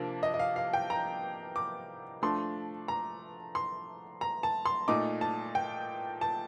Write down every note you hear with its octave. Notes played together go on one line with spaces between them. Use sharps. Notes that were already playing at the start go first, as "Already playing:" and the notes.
Already playing: C3 F3 A#3 D4
D#5
D#5
F5
F5
G5
A#5
D6
F3 A3 D4 C6
A#5
C6
A#5
A5
C6
A#2 A3 D#4 D6
A5
G5
A5